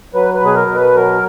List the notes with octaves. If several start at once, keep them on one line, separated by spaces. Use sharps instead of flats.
F#3 B4
B4
B2 G#4
A#4
B2
B4
F#3 A#4